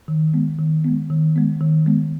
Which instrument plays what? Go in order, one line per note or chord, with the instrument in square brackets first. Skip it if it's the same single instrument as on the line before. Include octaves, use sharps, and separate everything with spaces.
[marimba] D#3
G#3 B3
D#3
G#3 B3
D#3
G#3 B3
D#3
G#3 B3